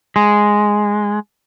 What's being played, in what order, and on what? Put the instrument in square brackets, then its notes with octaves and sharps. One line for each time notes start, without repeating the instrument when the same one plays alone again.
[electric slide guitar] G#3